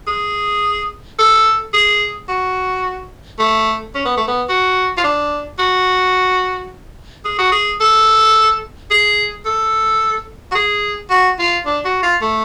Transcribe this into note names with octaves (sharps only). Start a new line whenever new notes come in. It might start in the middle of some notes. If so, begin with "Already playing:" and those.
G#4
A4
G#4
F#4
A3
C#4
B3
A3
B3
F#4
F4
D4
F#4
G#4
F#4
G#4
A4
G#4
A4
F#4
G#4
F#4
F4
D4
F#4
F4
A3